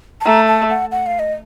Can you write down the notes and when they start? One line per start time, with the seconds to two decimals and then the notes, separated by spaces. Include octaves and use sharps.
0.21 A5
0.25 A3 A#5
0.48 A5
0.70 F#5
0.92 F#5
1.06 F5
1.19 D#5